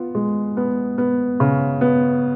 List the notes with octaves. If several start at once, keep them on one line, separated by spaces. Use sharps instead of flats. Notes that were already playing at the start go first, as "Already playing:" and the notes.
Already playing: B3 F4
G#3
B3
B3
C#3
B3